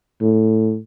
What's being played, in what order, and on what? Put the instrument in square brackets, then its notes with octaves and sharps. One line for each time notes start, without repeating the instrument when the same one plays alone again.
[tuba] A2